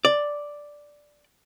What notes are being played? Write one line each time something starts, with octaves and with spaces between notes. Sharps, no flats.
D5